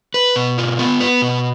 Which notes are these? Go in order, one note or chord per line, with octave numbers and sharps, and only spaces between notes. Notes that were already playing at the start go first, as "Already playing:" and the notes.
B4
B2
F4
B3
B4
B2